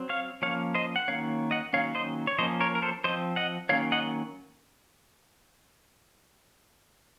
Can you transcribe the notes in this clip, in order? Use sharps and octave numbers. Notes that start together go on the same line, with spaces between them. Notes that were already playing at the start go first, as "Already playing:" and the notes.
Already playing: F#3 C4
C#5 F5
F3 A#3 C#4 C#5 F5
C5 D#5
F#5
D#3 F#3 A#3 C#4 C#5 F5
D#5 F#5
D#3 F#3 A#3 C#4 C#5 F5
C5 D#5
C#5
F3 A#3 C#4 C5 D#5
A#4 C#5
A#4
A4 C5
F3 C4 C5 D#5
D#5 F#5
D#3 F#3 A#3 C#4 C#5 F5
D#5 F#5